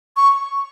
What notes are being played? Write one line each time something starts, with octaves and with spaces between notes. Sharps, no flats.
C#6